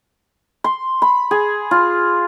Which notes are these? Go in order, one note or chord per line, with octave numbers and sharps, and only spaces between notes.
C6
B5
G#4
F4